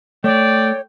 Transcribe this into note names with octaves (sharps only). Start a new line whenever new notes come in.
A3 C#5 D5 G5